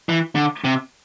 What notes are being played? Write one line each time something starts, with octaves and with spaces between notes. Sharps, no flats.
E3
D3
C3